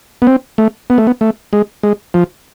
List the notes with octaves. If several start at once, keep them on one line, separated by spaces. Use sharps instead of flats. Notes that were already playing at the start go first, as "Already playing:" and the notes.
B3
C4
A3
B3
A3
B3
A3
G#3
G#3
F3